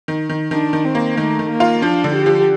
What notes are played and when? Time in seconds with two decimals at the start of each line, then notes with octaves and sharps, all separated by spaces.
0.08 D#3
0.29 D#3
0.51 D#3 D4
0.73 D#3
0.84 C4
0.95 A#3
1.17 D#3 A3
1.39 D#3
1.50 A#3
1.60 F4
1.82 F3 D4
2.04 D3
2.15 G4
2.26 F3